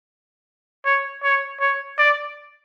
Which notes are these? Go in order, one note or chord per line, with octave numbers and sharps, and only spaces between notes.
C#5
C#5
C#5
D5